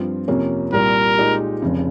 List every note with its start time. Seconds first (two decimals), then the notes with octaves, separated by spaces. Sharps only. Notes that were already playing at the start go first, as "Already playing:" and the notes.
Already playing: G2 F3 C4 F4
0.28 F2 C3 F3 A#3 C#4
0.73 C2 A#2 G3 A#4
1.18 A#2 G#3 D#4 G4
1.62 F1 F2 C#3